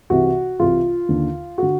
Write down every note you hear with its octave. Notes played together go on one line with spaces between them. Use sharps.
C2 C3 E3 F#4
C2 C3 E3 F4
D#2 D3
D3 F#4